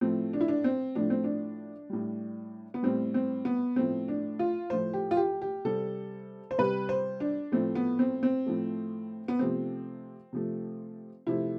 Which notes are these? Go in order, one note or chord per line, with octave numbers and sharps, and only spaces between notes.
A2 F3 A3 C4
D4
E4
D4
C4
A2 F3 A3 D4
C4
D4
A2 G3
B3
A2 G3 C4
C4
B3
A2 F3 A3 C4
D4
F4
A2 F3 A3 C5
G4
F4
G4
G4
C3 G3 A4
C5
C3 G3 B4
C5
D4
A2 F3 A3 C4
B3
C4
C4
A2 F3 A3
B3
C3 F3 A3 C4
C3 F3 A3
C3 F3 A3 E4